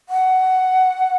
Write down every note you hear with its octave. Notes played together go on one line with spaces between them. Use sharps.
F#5